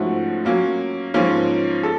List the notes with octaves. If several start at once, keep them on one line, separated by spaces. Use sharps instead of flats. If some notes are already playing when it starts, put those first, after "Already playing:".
Already playing: G#2 F3 A3 C#4 F#4
F#3 A#3 C#4
G#2 F3 A#3 C#4
A4